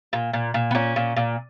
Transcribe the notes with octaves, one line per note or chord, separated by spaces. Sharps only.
A#2
A#2
A#2
B3
A#2 C#4
A#2
A#2